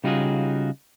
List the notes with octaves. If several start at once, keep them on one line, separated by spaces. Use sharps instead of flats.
C#3 G3 D#4 F4 F#4 G#4